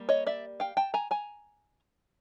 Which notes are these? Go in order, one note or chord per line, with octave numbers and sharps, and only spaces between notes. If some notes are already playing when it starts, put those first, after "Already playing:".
Already playing: G3 A#3
C#5 D#5
D5 E5
F5 G5
G5 A5
G#5 A#5
G#5 A#5